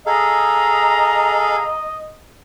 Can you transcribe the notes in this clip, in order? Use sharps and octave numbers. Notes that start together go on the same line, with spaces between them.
G#4 A4 D#5 F5 A#5